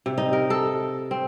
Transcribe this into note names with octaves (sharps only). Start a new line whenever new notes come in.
C3
D#4
A#4
A4
C4